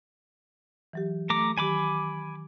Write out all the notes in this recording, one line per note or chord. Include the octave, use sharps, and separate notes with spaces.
E3 F#3 G4
A3 A#5 D6
D#3 F#3 G4 G#5 B5 D6